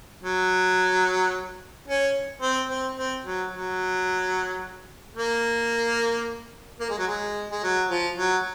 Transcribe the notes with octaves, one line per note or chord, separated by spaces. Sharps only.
F#3
C#4
C4
C4
C4
F#3
F#3
A#3
A#3
G#3
F#3
G#3
G#3
F#3
F3
F#3